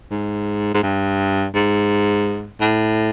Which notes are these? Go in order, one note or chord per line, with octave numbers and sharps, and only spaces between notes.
G#2
G#2
G2
G#2
A2